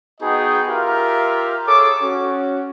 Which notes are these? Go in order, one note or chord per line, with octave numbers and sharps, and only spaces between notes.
B3 D#4 F#4 G#4 D#5 G5
F4 G4 A#4 E5 F5
G#4 A4 C#5 D6
C#4 F#4